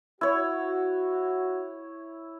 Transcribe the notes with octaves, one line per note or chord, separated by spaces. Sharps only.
E4 F#4 C#5